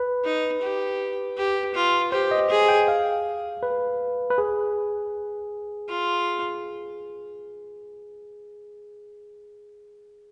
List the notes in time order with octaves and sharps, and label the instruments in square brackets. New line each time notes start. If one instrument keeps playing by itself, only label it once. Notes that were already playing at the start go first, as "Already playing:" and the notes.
Already playing: [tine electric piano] B4
[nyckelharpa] D#4
G4
G4
F4
[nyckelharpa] G4 [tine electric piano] C5
[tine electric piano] D#5
[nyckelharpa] G#4
[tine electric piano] G5
F5
B4
B4
G#4
[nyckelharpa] F4